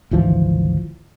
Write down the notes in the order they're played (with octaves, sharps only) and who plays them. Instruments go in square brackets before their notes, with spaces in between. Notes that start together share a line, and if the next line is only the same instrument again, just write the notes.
[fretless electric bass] G#1 D2 E3 F3